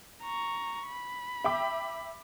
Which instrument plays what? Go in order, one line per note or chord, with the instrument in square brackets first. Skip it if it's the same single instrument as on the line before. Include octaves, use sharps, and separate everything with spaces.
[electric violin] A#5 C#6
B5
[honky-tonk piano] E5 G5 D6